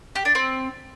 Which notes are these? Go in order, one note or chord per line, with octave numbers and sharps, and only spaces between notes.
G4
D4
C4